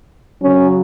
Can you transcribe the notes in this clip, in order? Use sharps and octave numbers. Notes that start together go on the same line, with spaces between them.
C#3 F#3 C#4